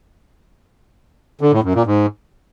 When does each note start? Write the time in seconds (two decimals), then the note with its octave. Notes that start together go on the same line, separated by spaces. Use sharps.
1.41 D3
1.52 A2
1.64 F#2
1.75 A#2
1.86 G#2